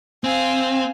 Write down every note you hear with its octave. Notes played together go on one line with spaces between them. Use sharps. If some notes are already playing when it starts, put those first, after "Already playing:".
C4 F5 G#5